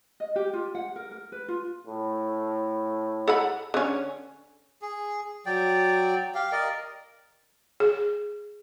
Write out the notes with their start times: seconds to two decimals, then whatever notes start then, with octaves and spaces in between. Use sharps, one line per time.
0.20 D#5
0.36 G4
0.53 F4
0.75 F#5
0.96 A#4
1.11 A#4
1.32 B4
1.48 F4
1.86 A2
3.28 A4 F#5 B5
3.74 D3 C#4
4.82 G#4
5.46 F#3 D5 G5
6.35 G4 F5
6.52 A#4 D5 D#5
7.80 G#4